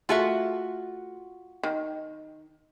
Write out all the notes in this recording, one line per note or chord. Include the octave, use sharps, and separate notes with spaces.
A3 F4 F#4 G#4 A4 E5
D#3